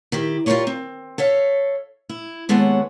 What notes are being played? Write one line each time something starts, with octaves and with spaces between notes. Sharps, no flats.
D#3 E4 G4
F4 G4 G#4 A#4 C#5 D5
C4
A4 C#5 E5 F5
E4
D#2 G#3 B3 A4 C#5 F#5